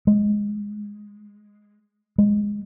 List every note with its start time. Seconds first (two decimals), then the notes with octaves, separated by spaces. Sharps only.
0.07 G#3
2.18 G#3